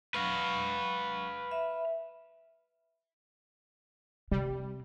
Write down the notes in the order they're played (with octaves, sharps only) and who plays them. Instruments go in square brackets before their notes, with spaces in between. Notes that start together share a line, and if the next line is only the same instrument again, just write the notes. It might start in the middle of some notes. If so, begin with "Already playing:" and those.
[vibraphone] F#3 C#6 [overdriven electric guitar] B4 F5
[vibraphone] E5
[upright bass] C3 [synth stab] G3